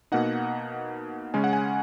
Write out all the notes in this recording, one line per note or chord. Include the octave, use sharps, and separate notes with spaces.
B2 A#3 D#4 F#5
C#3 G#3 C#4 G#5
F#5
G#5